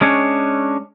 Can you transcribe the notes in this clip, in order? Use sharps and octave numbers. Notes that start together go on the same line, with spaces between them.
G#3 C#4 D4 C#5